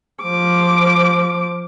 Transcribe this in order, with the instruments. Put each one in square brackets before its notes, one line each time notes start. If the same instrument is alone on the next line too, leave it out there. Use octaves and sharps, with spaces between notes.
[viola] F3 D6